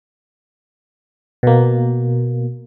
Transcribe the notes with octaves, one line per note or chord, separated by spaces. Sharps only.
B2 A#3